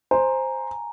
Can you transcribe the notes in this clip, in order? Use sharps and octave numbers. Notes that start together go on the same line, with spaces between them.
C5 G#5 A#5